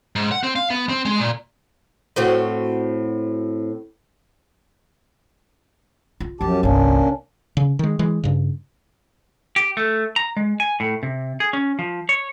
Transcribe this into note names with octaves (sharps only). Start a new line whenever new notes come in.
G#2
F#5
C4
F5
B3
C4
G#3
A#2
A2 C4 F#4
F4
F#2 F3 F#3 G4 A5
G1 C2 A#3 C#4 D4
C#3
D#3 G#3
E3 G#3
G2 C#3
G4
A3
A#5
G#3
G#5
A2
C3
G#4
C#4
F3
C#5